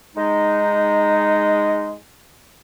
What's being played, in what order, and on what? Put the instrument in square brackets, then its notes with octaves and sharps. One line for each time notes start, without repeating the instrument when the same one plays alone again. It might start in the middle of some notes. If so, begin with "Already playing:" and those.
[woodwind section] G#3 D#4